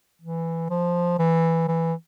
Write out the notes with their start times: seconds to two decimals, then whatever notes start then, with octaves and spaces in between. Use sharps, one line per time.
0.21 E3
0.70 F3
1.19 E3
1.68 E3